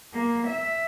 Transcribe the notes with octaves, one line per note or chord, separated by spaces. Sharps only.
A#3
E5